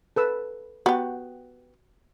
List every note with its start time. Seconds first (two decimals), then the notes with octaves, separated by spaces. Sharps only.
0.16 A4 B4 E6
0.86 B3 F#4 G4